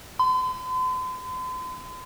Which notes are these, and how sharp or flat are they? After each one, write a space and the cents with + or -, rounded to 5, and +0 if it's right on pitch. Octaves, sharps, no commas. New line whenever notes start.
C6 -45